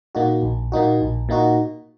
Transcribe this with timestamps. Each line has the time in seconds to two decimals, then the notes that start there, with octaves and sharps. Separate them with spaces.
0.15 A#2 A#3 D#4 F#4
0.42 A#1
0.72 A#2 A#3 D#4 F#4
1.01 A#1
1.29 A#2 A#3 D#4 F#4